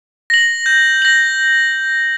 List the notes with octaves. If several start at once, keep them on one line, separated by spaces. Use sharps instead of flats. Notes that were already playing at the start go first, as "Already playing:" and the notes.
A#6 F#7
G6
A#6 F#7